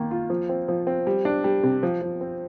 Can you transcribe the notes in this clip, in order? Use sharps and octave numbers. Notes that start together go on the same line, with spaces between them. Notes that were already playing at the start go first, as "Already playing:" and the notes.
Already playing: D#3 A#3
F4
F3
C4
F3
C4
G3
D4
G3
C3
F3
F3
C4